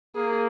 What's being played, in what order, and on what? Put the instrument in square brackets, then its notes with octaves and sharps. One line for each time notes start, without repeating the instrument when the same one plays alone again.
[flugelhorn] A#3 [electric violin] G#4